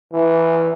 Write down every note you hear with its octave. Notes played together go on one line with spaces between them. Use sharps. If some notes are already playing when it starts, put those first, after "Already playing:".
E3